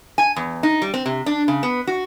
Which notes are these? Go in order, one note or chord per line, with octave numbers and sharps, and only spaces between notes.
G#5
E2
D#4
G3
C4
C3
D4
C#3
B3
F#4